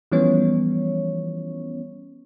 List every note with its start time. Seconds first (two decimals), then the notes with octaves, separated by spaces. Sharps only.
0.12 E3 F3 G3 B3 C#4 C#5